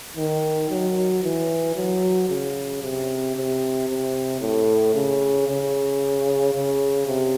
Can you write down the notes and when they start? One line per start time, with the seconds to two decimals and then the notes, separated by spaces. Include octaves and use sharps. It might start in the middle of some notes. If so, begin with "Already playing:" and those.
0.17 D#3
0.70 F#3
1.23 E3
1.76 F#3
2.29 C#3
2.83 C3
3.36 C3
3.88 C3
4.41 A2
4.94 C#3
5.48 C#3
6.53 C#3
7.06 C3